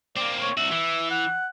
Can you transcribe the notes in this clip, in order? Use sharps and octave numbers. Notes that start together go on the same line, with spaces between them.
A#3 C4 D5
C#5
C2 F#4 E5
E3
F#5